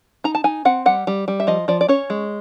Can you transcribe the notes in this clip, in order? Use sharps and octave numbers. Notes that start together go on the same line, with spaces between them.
D#4 A#5
A5
D#4 G#5
C4 F#5
G3 F#5
G3
G3
E5
F3 D#5
F3 D5
D5
C#4 C#5
G#3